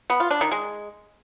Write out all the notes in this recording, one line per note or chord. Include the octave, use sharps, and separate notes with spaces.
B3
F4
D4
D#3
G#3